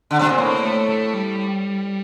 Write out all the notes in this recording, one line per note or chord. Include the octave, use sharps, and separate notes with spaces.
D3
C3 D4
A#2 C4
A2 A#3
A3
A3
G3